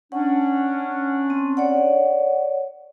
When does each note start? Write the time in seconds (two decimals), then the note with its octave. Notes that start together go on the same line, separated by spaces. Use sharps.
0.12 C#4 D4 F#5
1.30 C4
1.57 C#5 D5 F#5